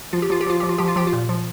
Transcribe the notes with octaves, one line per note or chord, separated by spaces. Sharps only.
F3 F4
G4
F3 F4
G4
F3 F4
F3 G4
F4
F3 G4
F4
F3 G4
F4
A#2
F3